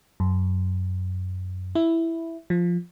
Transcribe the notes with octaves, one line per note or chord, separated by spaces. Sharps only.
F#2
E4
F3